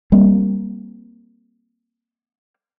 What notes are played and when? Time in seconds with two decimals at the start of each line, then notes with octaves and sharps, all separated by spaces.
0.12 G3 A#3 C4